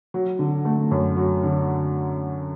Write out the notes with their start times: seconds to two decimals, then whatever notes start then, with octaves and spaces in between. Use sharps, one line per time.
0.14 F#3
0.39 D3
0.65 A3
0.91 F#2
1.17 F#3
1.43 D3